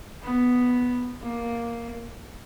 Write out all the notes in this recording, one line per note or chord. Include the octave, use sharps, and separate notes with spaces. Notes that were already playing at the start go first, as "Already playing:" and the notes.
B3
A#3